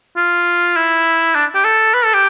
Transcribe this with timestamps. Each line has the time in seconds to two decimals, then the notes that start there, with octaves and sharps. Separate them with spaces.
0.16 F4
0.76 E4
1.35 D4
1.55 G4
1.65 A4
1.94 B4
2.05 A4
2.14 G4